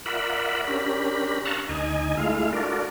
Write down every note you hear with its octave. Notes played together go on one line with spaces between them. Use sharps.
F4 A#4 D5 E5 F#5 B5
C#4 D4 G4 A#4 B5
F5 A5 A#5 C#6 E6 F#6
D2 D#4 D#5 G#5
G#3 A3 E4 F4 F5
D4 F4 F#4 A4 A#4 D5